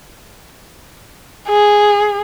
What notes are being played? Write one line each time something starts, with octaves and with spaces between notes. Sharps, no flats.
G#4